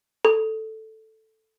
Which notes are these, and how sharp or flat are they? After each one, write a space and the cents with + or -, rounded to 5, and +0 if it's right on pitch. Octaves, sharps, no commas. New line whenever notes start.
A4 +0